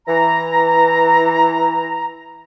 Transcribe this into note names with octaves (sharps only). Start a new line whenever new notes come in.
E3 A#5